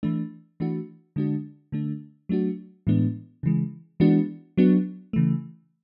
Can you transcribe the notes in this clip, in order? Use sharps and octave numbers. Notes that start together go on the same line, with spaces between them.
E3 A3 D4
E3 A3 D4 F#4
D3 G#3 D4 F#4
D3 A3 D4
F#3 A3 D4 F#4
A2 E3 G#3 B3 D4
C#3 E3 G#3
E3 G#3 B3 D4 F#4
F#3 B3 D4 F#4
C#3 E3 A3